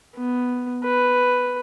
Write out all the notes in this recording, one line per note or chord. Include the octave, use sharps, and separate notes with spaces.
B3
B4